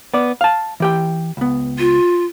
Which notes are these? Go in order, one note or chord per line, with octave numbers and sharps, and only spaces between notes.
B3 D5
F5 A5
E3 G4 G5
C#2 B3
F4